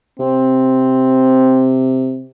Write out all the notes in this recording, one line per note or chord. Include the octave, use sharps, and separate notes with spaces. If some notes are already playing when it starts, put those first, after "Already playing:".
C3 C4